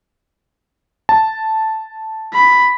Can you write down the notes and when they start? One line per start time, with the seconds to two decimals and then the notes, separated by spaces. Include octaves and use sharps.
1.09 A5
2.34 B5